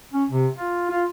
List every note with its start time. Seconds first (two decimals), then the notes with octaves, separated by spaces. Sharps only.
0.13 C#4
0.31 C3
0.55 F4
0.90 F4